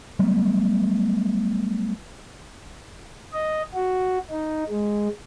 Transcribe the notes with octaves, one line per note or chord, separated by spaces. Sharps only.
F#3 G3 A3 B3
D#5
F#4
D#4
G#3